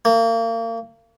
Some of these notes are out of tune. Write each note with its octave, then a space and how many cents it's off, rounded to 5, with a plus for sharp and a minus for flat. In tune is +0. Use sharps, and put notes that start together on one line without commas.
A#3 -35